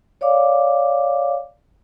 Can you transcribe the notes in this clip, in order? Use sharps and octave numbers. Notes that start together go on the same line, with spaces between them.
C#5 D5 F5 D6